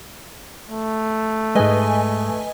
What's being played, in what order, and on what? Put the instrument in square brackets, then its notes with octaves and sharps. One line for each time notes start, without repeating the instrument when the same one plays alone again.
[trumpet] A3
[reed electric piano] G#2 G#3 [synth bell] B4 D#5 G#5